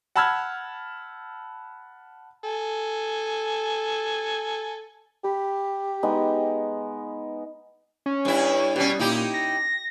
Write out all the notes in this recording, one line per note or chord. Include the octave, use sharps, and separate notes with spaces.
F#5 A5 B5 E6 F6 G#6
A4 G#5
G4 B5
G#3 B3 D#4
C#4
G2 E4
B2 G3 C#4
A#2 D#4 E4 G4
A#6